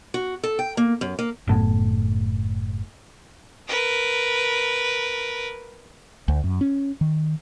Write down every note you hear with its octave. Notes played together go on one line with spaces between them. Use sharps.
F#4
A4
G5
A#3
F#2
A#3
F#1 A2 B3
A#4 B4
D2
F#2
C#4
D#3